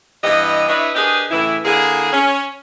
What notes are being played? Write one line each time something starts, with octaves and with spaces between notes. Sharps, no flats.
G2 E3 B3 G4 D#5
D4 E4 B4 C#5 D#5 E5
D4 G4 G#4 A#4 B4 D#5
A2 C#3 E3 E4
D3 A#3 E4 G#4
C#4